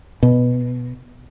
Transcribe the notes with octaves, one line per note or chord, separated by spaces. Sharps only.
B2